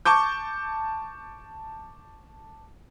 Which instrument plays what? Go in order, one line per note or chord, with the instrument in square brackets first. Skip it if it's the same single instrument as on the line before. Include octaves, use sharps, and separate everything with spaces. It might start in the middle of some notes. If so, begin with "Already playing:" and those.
[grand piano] A5 C#6 D6 G6